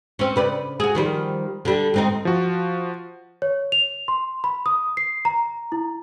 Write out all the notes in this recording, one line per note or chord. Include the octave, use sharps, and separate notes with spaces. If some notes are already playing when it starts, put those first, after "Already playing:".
C4 C#4
C#3 B4 D5
F#4 G#4
D#3 F3 G3
D3 G3
G#2 C4 D#4
F3 F#4
C#5
F7
C6
B5
D#6
C7
A#5
E4